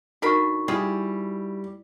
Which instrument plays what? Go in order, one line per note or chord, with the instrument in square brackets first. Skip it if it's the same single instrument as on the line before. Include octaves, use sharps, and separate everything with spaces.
[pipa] D3 A#4 B5 [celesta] D#4 F#4 C#6
[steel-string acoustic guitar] G3 [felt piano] E4 [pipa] F4 G4 G#4